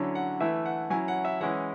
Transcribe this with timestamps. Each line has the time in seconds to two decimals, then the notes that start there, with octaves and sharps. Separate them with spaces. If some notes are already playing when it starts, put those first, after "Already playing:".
Already playing: D3 F#3 C#4 E4
0.15 F#5
0.40 E3 A3 E4 E5
0.66 F#5
0.90 F#3 C#4 E4 G#5
1.08 F#5
1.25 E5
1.41 E3 G#3 C#4 E4 F#5